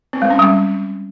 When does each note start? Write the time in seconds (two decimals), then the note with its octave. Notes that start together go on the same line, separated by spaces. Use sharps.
0.13 C4
0.22 G#3
0.30 C#4
0.39 G3